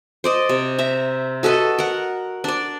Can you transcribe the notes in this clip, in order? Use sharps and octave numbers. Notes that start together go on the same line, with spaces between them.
C5 D5 D#5
C3
E5 A#5
F#4 A4 B4 D#5
A#4 F#5
D4 D5